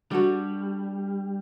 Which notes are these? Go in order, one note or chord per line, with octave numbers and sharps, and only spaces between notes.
G3 D4 F#4 A4